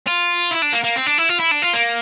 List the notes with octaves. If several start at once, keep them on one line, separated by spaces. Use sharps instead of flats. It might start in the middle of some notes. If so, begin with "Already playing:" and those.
F4
E4
D4
A#3
A#3
C4
D4
E4
F4
E4
D4
F4
A#3